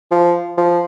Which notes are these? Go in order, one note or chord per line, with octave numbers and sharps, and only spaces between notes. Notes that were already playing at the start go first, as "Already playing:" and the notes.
F3
F3